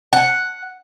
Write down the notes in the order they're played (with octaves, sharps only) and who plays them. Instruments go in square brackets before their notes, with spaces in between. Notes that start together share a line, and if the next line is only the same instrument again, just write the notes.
[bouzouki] F#5